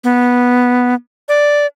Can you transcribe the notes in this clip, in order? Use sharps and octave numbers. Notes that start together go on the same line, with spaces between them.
B3
D5